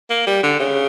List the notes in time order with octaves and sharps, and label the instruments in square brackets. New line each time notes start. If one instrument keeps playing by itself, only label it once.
[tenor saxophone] A#3
G3
D3
C#3